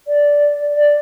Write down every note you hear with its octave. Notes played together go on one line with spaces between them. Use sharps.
D5
D5